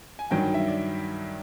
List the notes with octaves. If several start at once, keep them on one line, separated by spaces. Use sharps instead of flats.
G#5
G2 D#3 F#3 G5
E5
D5